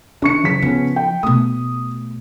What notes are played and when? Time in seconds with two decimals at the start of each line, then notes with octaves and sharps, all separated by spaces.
0.22 D#3 D4 C#6 C#7
0.43 F#1 B6
0.62 C#3 F3 B3 C#4
0.96 G5
1.23 B2 A3 D#6